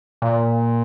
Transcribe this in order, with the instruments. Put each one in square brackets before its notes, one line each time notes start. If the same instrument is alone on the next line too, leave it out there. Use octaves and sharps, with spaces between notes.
[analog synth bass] A#2